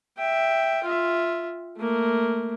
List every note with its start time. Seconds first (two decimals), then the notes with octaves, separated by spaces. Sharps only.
0.18 E5 G5
0.83 F4 E5
1.77 A3 A#3